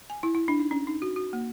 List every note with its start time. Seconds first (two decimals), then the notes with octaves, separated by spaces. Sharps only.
0.10 G#5
0.23 E4
0.35 E4
0.48 D4
0.59 D#4
0.71 C#4
0.87 D#4
1.02 F#4
1.16 F#4
1.33 A#3